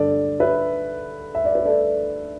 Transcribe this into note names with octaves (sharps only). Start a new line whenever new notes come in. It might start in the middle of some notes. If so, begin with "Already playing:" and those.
Already playing: G2 D3 A4 D5
B4 E5
E5
D5
B4
A4 D5